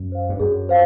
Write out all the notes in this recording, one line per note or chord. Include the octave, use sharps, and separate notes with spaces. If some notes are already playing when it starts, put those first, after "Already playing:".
Already playing: F#2
C5 F5
G2
F#2 G#4
C5 F5